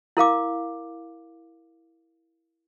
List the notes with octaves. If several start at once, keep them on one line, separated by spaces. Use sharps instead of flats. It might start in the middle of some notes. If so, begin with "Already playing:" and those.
E4 A#4 F5 D6